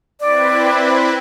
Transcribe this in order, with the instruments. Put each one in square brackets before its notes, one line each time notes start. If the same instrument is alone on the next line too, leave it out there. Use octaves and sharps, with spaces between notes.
[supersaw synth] C4 E4 B4 [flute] D5